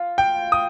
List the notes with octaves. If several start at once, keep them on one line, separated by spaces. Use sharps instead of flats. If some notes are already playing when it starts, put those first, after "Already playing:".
Already playing: F4
G5
D#6